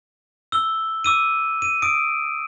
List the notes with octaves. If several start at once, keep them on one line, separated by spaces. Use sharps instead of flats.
E6 G7
D6 E6 D#7
D#7
D#6 D7